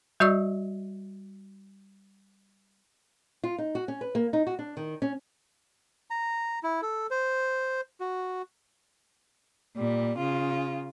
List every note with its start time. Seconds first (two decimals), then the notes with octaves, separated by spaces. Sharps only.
0.20 G3 F#4 D5 D#5 C#6 E6
3.44 F4
3.58 D#4
3.75 F#4
3.88 C#4
4.01 B4
4.15 A#3
4.33 D#4
4.47 F#4
4.59 D4
4.77 D#3
5.02 C#4
6.10 A#5
6.63 E4
6.82 A4
7.11 C5
8.00 F#4
9.77 A#2 G3
10.18 C#3 F4